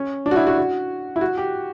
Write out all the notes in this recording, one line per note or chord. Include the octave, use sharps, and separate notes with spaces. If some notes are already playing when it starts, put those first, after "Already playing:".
Already playing: C#4
D4
F#4
E4
F#4
F#4
E4
F#4
G4